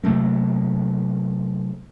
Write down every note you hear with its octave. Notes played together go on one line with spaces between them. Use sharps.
C3 F#3 A3 A#3